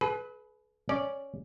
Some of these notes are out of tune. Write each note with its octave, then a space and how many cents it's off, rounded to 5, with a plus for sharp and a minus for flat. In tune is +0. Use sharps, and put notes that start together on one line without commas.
G#4 +45 B4 +0
C#4 +0 D5 +0